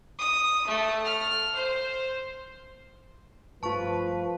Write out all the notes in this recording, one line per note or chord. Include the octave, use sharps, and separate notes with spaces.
D#6
A3
F6
C5
G2 F3 A3 F4 B4 A5 C#6